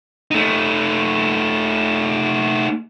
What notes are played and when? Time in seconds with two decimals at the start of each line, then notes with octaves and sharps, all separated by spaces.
0.31 A3 D#4